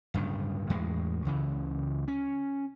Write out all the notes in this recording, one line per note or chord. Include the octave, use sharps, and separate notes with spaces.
D1 G2 C#3
E2 A2 G#3
C#2 C#3 E3
C#4